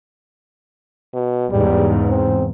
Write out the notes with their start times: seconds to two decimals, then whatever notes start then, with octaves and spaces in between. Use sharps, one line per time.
1.14 B2
1.52 E2 G#2 C#3 G3
2.09 C4